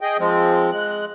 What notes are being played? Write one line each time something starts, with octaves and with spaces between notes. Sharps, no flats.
G#4 D#5 G5
F3 G#3 C4
G#3 F#6